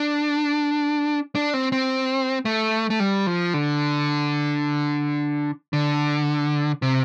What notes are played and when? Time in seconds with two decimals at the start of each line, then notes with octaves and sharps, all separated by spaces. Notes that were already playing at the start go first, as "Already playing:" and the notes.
Already playing: D4
1.35 D4
1.54 C4
1.72 C4
2.45 A3
2.90 A3
3.00 G3
3.27 F3
3.54 D3
5.73 D3
6.82 C3